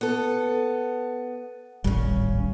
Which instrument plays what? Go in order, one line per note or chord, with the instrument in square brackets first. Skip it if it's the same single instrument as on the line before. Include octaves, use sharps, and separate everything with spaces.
[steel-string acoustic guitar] B3 A4
[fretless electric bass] D1 G#1 G3 [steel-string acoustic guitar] C#3 C#4